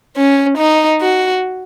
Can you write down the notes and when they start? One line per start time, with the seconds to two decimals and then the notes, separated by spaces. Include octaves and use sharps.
0.17 C#4
0.58 D#4
1.01 F#4